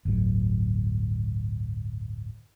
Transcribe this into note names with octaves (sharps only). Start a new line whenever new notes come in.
G1 D2 A2 F#3